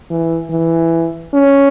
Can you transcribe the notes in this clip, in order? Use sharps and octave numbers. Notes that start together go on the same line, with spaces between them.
E3
E3
C#4